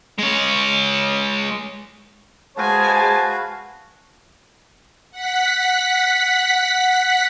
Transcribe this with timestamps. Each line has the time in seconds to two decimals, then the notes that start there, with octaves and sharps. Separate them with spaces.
0.19 G#3 C#5
2.58 G#3 F#4 G#4 B4 C5 F5 G#5 A5
5.11 F#5 B6